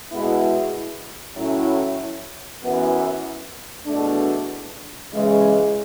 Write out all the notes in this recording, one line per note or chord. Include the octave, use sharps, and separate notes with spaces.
B2 G#3 B3 E4
A2 F#3 C#4 E4
F#2 E3 B3
E2 B2 A3 D4
C#3 E3 G#3 B3